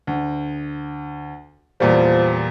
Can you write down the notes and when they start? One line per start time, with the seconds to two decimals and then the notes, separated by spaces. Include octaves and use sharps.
0.07 D2
1.80 E2 A#2 F3 G3